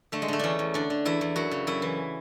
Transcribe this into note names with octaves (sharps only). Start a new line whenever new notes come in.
D3 A3
G#3
D3 A3
E2 C#4 D4
E2
D3 D4
D3
E2 E4
E2
F#2 F#4
C#3
F#2 E4
E3